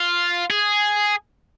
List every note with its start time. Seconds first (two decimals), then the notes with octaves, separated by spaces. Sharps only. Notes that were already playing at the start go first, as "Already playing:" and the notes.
Already playing: F4
0.50 G#4